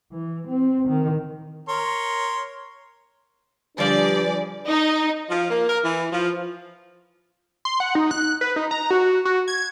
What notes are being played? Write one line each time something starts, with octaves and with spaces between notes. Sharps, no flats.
E3
C4
D#3
A#4 C#5 C6
D3 F3 G3 D4 G#4 B4 D5
D#4
F3
A#3
A#4
E3
F3
C6
F#5
D#4
F#6
B4
D#4
A#5
F#4
F#4
G#6